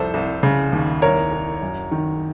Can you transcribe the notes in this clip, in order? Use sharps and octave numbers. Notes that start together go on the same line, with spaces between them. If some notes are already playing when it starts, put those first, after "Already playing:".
Already playing: C2 F2 A4 C5
C2
C#3
D#2
C2 A#4 C#5
C2
F#2
D#3